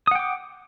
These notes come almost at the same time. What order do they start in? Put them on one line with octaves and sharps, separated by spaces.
D#6 F#5 G5 D6